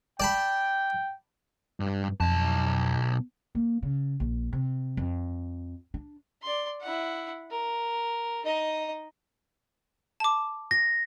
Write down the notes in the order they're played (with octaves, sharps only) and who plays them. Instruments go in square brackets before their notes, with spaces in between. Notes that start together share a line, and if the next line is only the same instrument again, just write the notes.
[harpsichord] D5 A5 B5 [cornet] G5
[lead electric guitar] G2
[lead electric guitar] B1 A5 [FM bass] F2
[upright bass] A#3
C#3
A#1
C3
F2
D4
[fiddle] D5 C6
E4 F#5
A#4
D#4 D#5
[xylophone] A5 D6
[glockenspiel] A#6